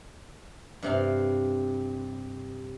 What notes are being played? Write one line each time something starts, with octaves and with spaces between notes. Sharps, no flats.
G2 C3 F5